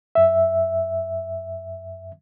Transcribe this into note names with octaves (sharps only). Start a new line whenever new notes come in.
F#2 E5